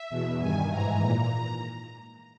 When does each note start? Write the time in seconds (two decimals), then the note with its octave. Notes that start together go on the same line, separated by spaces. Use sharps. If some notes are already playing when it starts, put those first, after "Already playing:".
Already playing: E5
0.10 E2 B2
0.40 G2 D#3 G#5
0.70 G#2 E3 A#5
1.00 A#2